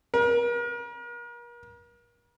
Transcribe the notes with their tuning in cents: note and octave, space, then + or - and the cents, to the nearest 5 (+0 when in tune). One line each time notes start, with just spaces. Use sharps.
A#4 +40